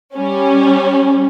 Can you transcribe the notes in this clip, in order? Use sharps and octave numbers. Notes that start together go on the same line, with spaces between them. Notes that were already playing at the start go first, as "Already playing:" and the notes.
G3 C#4